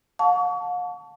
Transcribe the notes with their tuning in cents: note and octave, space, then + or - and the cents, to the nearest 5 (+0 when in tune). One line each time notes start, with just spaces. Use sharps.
F5 +45 A5 -5 C#6 +35